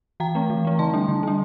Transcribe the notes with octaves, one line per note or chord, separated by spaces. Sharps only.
E3 G5 A#5
A3 C4
E3
A3 C4
D3 A5 C6
G3 D4
D3
G3 D4